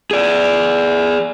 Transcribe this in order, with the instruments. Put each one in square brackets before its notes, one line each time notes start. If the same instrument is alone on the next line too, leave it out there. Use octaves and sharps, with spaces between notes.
[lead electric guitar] G#4 D5